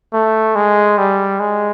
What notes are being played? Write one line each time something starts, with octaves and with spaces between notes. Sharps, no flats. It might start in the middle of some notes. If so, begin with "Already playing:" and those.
A3
G#3
G3
G#3